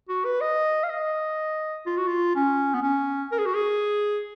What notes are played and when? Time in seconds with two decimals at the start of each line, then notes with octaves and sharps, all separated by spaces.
0.09 F#4
0.25 B4
0.41 D#5
0.83 F5
0.89 D#5
1.86 F4
1.97 F#4
2.07 F4
2.35 C#4
2.74 B3
2.83 C#4
3.32 A#4
3.39 G#4
3.46 F#4
3.55 G#4